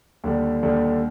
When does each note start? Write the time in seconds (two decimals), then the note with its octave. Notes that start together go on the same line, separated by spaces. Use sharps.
0.24 D#2 D3 G3
0.63 D#2 D3 G3